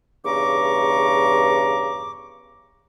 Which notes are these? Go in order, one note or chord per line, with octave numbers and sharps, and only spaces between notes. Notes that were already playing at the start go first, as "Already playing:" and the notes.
E2 G2 C#3 A#5 C#6 D6